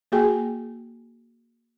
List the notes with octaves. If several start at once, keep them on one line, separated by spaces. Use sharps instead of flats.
A#3 F#4 G#4 G5 G#5